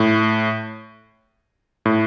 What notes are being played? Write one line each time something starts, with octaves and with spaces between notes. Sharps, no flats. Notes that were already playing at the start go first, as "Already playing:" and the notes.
Already playing: A2
A2